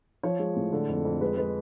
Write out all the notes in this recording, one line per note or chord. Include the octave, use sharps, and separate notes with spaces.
F3 C#5
G#3
A2
D3
F2
F2
G#3 B4
G#3 B4